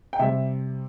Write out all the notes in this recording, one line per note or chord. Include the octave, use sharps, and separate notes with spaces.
G5
C3 G3 E5